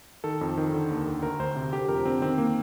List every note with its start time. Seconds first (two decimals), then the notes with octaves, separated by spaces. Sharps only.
0.24 D#3 A4
0.41 F2
0.57 D#3
0.73 D3
0.90 D#2
1.07 D3
1.23 D2 A#4
1.39 D2 C5
1.56 C3
1.72 D3 G4
1.88 F2 A#4
2.05 D3 C4
2.22 D#3 C4
2.38 A#3